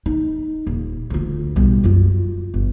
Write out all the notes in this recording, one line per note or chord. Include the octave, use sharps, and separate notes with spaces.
D#4
D#1
D2 F4
B1 G3
F#2 F4
G1